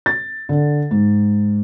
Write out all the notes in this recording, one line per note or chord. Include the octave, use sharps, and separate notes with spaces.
A6
D3
G#2